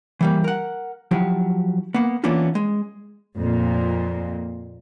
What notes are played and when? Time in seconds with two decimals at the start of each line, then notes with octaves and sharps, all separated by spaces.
0.21 E3 G3 A#3
0.44 A#4 F#5
1.11 F3 F#3 E4 G4
1.94 A#3 B3
2.24 E3 A#3 B3 C#4 D4 F4
2.55 G#3
3.37 F2 A#2